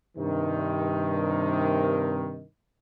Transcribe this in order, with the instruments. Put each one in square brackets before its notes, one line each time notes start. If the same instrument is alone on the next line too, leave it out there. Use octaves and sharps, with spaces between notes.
[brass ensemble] G2 C3 D#3